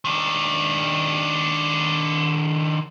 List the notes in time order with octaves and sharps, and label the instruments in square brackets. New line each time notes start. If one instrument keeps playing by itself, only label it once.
[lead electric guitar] D#3 D4